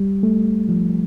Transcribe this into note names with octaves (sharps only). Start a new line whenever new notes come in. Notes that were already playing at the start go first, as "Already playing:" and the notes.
Already playing: G3
A3
F3